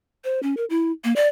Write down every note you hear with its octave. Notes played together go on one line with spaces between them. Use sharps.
C5
C#4
A#4
E4
A#3
D5